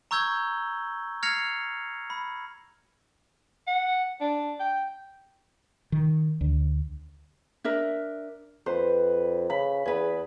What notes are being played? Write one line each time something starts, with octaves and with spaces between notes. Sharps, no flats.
A#5 C#6 E6 G6 G#6 G7
F6 G#6 A#6 C7 C#7 F7
B5
F#5
D4
G5
D#3
D2
D4 A#4 E5
F2 B4 C5
C#3 B5
E2 G#4 B4